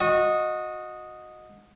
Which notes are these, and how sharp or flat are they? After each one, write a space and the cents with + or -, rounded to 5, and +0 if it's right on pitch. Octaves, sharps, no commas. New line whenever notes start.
F#4 -25 D#5 +0